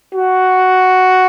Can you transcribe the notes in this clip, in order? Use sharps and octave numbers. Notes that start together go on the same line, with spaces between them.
F#4